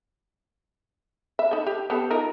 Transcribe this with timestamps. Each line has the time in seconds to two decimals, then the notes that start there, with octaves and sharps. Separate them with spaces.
1.39 E5
1.51 D#4 A4
1.67 G4
1.90 B3 G4 A4
2.11 D#4 F4 A#4